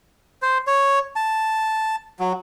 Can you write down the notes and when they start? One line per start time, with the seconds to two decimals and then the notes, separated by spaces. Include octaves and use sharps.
0.42 C5
0.67 C#5
1.16 A5
2.19 F#3